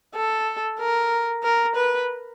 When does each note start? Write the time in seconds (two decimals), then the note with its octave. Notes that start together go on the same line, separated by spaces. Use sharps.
0.15 A4
0.79 A#4
1.43 A#4
1.76 B4